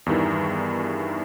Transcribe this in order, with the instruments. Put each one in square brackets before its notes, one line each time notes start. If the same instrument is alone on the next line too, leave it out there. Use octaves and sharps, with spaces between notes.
[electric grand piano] E2 G2 D#3 E3